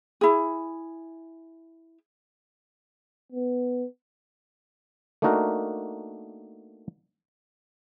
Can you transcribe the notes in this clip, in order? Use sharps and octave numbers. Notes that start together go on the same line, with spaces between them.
E4 G#4
B3
A3 A#3 D4 D#4 F#4 A#4